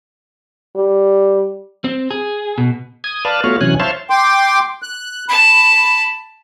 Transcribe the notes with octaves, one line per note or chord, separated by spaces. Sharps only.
G3
C4
G#4
B2
D#6 G#6
B4 D5 F5 A5
A3 B3 F4 F#4 C#5 F5
C3 E3 F#3 C#4 G#5 F#6
C5 C#5 E5 F5 A5 C6
G5 C6 D6
F#6
A5 B5